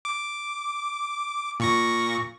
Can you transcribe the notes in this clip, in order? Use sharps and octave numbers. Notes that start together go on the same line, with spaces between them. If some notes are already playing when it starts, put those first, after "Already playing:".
D6
A#2 C#6 A#6